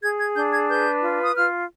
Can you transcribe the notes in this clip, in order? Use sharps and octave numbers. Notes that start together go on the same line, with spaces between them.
G#4 G#6
G#6
D4 G6
G#6
B4 G6
F4
D#6
F4 F6